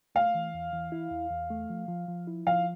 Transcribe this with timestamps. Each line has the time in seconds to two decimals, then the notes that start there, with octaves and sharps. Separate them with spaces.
0.15 A3 F5
0.35 E3
0.54 E2
0.73 E3
0.92 E4
1.11 E2
1.31 E2
1.51 A3
1.70 F3
1.88 F3
2.08 F3
2.27 E4
2.47 F3 F5